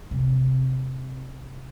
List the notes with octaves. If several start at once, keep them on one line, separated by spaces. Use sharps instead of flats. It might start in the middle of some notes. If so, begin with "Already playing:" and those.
C3 C4